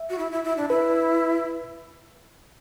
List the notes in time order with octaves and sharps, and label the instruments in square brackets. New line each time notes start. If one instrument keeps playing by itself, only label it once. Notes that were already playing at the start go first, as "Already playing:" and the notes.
Already playing: [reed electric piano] E5
[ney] F#4
E4
E4
E4
D4
[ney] E4 [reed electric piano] B4